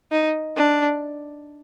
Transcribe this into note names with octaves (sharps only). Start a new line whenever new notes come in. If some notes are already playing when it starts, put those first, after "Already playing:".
D#4
D4